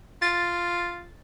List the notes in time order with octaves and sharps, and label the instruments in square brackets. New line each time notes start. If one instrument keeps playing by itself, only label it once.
[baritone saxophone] F4 [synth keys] A6